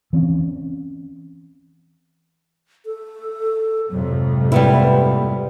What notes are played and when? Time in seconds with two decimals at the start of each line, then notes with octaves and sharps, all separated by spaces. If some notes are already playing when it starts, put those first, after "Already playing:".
0.13 E3 C4 C#4
2.85 A4
3.90 F2 G#2 C3 F#3
4.52 G3 A#3 B3 E4